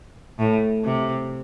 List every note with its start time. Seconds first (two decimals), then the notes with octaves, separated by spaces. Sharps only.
0.39 A2
0.84 C3